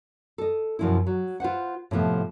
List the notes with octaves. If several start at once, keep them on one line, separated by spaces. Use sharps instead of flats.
A4 D#5
F#2 B2 F3 C4 E4
F#3
F4 B4 C5 F#5
A2 C3 F3 B3